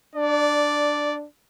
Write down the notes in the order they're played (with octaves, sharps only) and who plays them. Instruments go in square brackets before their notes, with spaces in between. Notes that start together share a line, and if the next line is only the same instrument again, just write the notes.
[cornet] D4 [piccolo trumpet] D5